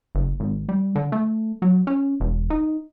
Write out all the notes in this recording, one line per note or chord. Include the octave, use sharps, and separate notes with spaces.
F#1
G#1
G3
D3
A3
F#3
C#4
E1
D#4